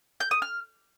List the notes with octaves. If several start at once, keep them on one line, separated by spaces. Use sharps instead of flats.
G6
D#6
F6